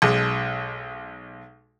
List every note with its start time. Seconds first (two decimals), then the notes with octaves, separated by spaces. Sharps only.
0.02 B1 G#3